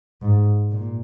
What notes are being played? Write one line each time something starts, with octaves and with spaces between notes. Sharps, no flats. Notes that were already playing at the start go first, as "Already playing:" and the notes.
G#2
A#2